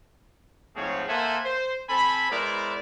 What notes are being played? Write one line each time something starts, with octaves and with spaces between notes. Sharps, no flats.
G#2 F3 A3 C4 G#4 C#5
A#3 A4 C5 E5 F#5 G#5
C5
C4 A4 G#5 B5
G#3 B3 E4 A#4 C5 D5